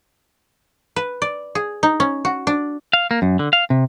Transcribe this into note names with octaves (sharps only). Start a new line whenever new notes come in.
B4
D5
G#4
D#4
C#4
F#4
D4
F5
A#3
F#2
D3
F5
C3